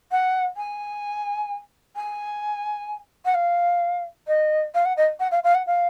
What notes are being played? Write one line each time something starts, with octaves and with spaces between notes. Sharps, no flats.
F#5
G#5
G#5
F#5
F5
D#5
F5
F#5
D#5
F#5
F5
F5
F#5
F5